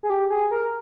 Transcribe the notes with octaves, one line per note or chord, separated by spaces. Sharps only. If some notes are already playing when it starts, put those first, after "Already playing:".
G#4
G4
G#4
A#4